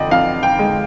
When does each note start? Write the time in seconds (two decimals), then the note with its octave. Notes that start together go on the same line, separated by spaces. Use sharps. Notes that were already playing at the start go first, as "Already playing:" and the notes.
Already playing: F2 D3 D5 D#5 G5
0.11 F2 F5
0.43 G5
0.59 G#3